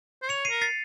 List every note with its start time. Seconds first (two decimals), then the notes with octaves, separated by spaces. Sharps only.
0.22 C5
0.29 C#5 C#7 F7
0.45 C7 D#7
0.50 A#4
0.61 A6 C7